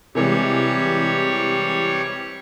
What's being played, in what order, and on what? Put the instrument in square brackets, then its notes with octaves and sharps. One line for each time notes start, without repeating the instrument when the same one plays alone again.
[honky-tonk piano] C3 E3 G#3 [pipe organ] G3 C#5